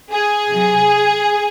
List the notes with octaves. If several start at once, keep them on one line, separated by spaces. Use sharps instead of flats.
G#4
C3 F#3